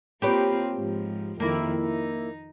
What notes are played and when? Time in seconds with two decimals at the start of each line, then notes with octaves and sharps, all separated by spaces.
0.22 A#3 C4 F4 G4 B4 C#5
0.75 G#2 F3
1.40 F2 D#3 A#3 E4
1.82 D#4